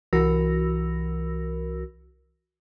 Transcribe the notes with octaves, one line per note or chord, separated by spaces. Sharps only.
C2 E3 F#4 A#4 E6 A#6